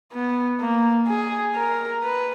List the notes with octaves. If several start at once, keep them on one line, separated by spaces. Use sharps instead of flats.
B3
A#3
G#4
A#4
B4